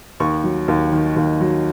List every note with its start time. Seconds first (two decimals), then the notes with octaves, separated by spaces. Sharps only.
0.20 D#2 C#6
0.44 F#3
0.68 D#2
0.92 D#3
1.16 D#2
1.41 F#3